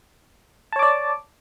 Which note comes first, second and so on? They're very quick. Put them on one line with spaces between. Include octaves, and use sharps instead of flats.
A5 C#5 D6 D5